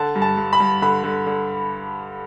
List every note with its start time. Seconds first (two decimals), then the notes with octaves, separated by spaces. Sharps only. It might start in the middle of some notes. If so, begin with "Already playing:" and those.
Already playing: D3 A5
0.15 G2
0.22 A5
0.37 G2
0.53 B5
0.60 G2
0.82 D3 B5
1.04 D3
1.27 D3